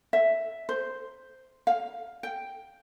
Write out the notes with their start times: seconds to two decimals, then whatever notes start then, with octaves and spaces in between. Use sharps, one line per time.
0.13 E5
0.69 C5
1.67 F5
2.23 G5